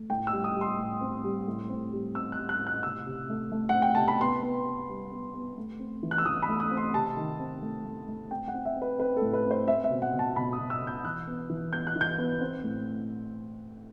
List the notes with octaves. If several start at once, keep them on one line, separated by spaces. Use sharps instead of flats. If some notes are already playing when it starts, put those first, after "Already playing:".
Already playing: A3
A2 G5
E6
G3
D#6
G3
C6
A2
C4
G3
A2
C4
G3
C4 E6
F#6
G3
F#6
A2
F#6
C3 E6
C3
A3
A3
F#5
C4
G5
C3 A5
B5
B3 C6
B3
B3
G3
B3
B3
A3
C4
E3
F#6
E6
E3 D#6
B5
A3
D#6
C4
C6
C3 A5
D#3
C4
A3
A3
A3
C4 G5
F#5
C4
E5
C4
B4
C4 B4
A2 A4
B4
C4
C5
C4 E5
E5
B2
F#5
B2
A5
B2 B5
D#6
B2
E6
B2
G6
E3 F#6
B3
E3
B3 G6
F#6
E3
G6
B3
C4
A2